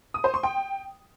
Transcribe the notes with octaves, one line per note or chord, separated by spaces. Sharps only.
D#6
C5
C6
G5